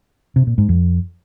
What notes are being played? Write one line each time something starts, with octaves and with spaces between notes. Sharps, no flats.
C3
A#2
G#2
F2